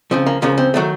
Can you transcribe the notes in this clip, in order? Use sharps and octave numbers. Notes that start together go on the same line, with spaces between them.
C#2 C#3 F3 C4
A#3
C#2 C#3 F3 A#3
C4
D#3 F#3 A3